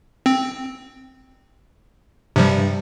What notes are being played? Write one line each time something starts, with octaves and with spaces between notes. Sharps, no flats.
C4
G2 C3 F3 G3